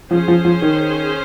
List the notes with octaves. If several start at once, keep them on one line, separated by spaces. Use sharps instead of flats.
F3 C#4 G#4 C5
F3
F3
D#3